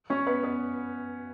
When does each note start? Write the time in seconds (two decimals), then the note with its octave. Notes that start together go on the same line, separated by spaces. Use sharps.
0.10 C#4 C#5
0.27 B3 B4
0.43 B3 B4